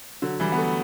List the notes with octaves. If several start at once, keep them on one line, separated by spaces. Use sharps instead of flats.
D3 F#3
E3 G3
B3
F#3 A3